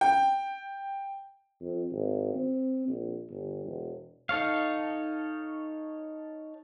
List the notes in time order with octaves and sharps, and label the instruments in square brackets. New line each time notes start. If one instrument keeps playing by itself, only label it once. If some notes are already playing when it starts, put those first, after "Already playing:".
[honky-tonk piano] G5
[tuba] F2
G#1
C4
A#1
G1
E1
[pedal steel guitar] D#4 A4 C#5 F5